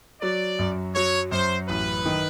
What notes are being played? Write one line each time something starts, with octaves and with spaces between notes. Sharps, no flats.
F#3 D5
F#2
F#3 C#5
F#2 C5
A1 B4
D#3